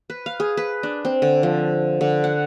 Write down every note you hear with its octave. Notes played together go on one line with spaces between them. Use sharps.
B4
F5
G#4
B4
D4
C4
D3
F3
D3
F#5